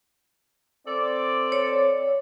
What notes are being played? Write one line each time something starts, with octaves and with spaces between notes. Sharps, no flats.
C4 A4 D5
C#5